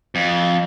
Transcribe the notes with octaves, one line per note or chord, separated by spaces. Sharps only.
F2